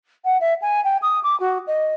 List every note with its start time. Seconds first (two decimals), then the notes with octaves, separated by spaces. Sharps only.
0.24 F#5
0.40 E5
0.61 G#5
0.84 G5
1.02 D#6
1.23 D6
1.39 F#4
1.67 D#5